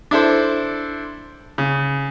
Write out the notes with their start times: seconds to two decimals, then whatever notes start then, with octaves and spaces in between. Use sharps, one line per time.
0.11 D4 E4 A4 C5
1.58 C#3